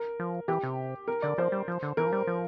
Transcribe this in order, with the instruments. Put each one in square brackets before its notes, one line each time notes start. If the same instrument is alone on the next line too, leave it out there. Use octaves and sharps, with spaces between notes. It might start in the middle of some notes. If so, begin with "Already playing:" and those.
Already playing: [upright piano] A#4
[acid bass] F3
[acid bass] E3 [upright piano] G4
[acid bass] C3
[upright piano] A#4
[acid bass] D3 [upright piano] D5
[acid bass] F3 [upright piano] C5
[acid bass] G3
F3
D3
[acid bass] E3 [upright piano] A#4
[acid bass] F3
G3
F3